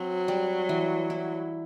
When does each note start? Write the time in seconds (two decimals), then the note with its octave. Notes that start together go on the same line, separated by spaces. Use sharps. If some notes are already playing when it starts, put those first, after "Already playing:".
Already playing: F#3 C4
0.28 G3
0.69 E3
1.10 E4